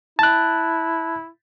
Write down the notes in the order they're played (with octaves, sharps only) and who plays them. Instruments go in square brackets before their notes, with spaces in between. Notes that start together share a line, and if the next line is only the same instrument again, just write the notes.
[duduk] E4 [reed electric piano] A5 F#6